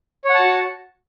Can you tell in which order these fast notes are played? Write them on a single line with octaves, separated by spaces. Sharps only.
C#5 F#5 A5 F#4